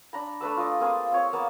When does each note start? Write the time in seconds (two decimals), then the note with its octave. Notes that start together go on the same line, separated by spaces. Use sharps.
0.13 D4 A#5 B5
0.41 A3 D4 B4 E6
0.57 F4 D5 D#5
0.81 A#3 C4 F4 G#4
1.12 C4 F4 C#5
1.33 A#3 B3 A5